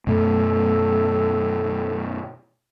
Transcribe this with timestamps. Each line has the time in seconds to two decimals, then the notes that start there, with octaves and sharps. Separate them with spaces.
0.07 F#2 B2 A3 A4